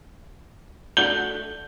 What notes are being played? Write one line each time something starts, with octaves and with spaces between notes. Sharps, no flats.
A3 D4 F#4 G6 G7